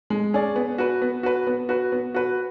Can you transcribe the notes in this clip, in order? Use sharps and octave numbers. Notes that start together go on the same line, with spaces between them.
G#3
C#4 G#4 D5
B3
F#4 B4
B3
F#4 B4
B3
F#4 B4
B3
F#4 B4